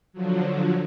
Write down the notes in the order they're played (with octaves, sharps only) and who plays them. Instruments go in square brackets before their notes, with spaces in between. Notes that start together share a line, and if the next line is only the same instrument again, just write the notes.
[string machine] D3 F3 F#3